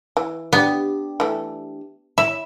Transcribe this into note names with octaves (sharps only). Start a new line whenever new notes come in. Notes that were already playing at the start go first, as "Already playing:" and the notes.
E3
B3 D4 G4
E3 A3
E4 E5